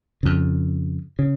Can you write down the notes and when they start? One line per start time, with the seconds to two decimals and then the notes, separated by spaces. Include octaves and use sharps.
0.23 F2 C#3
1.19 C#3